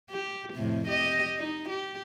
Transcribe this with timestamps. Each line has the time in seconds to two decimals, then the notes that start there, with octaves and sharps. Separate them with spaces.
0.11 G4
0.54 F2 A2 C3
0.88 G4 D#5
1.37 D#4
1.69 G4